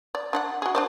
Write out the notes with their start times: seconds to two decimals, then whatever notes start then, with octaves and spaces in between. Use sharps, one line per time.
0.15 D5
0.33 D4 D5 F#5
0.62 F#4 G#4
0.75 D4 C5 D5